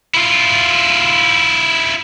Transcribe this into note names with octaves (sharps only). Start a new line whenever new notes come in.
E4 F4